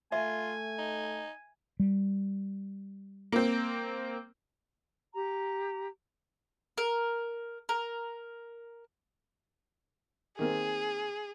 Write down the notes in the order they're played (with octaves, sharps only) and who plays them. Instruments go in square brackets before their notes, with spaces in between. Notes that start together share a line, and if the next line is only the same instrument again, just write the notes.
[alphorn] A3 [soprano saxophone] F4 [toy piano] E5 [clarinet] G#5
[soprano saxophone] D#4
[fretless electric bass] G3
[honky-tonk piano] A#3 C4
[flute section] G4 A#5
[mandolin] A#4
A#4
[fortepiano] D#3 A#3 C4 [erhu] G#4